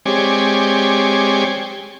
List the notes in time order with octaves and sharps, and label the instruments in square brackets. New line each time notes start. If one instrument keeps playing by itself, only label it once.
[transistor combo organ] G#3 C4 G4 C#5 D5 G#5